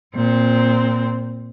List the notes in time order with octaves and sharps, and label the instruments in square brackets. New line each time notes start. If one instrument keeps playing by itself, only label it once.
[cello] A#2 C4